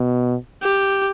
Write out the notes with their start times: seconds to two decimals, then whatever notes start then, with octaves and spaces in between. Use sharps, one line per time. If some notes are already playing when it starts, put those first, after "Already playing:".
Already playing: B2
0.62 G4